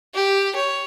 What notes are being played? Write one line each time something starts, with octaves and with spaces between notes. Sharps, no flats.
G4
C#5